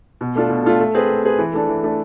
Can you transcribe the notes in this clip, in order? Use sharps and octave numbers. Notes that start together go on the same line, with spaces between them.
B2
A3 D4 F4 A4
B2
A3 D4 F4 A4
A3
C4 G#4 B4
A3
C4 G#4 B4
E3
A3 D4 A4
E3
A3 D4 A4